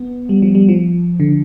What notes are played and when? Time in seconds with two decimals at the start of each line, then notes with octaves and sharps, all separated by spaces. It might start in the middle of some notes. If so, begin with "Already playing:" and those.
Already playing: B3
0.29 G3
0.42 F3
0.55 G3
0.69 F3
1.20 D3